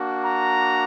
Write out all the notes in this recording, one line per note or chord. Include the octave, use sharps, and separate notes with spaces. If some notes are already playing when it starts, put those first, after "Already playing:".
Already playing: A#3 D4 F#4
A#5